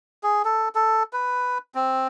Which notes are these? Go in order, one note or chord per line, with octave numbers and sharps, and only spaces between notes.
G#4
A4
A4
B4
C4